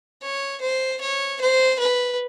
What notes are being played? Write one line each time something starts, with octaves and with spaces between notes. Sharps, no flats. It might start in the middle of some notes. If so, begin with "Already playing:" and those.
C#5
C5
C#5
C5
B4